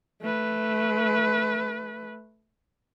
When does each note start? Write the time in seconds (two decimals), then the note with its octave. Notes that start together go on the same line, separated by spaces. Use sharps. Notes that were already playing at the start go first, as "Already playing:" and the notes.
0.21 A3 B4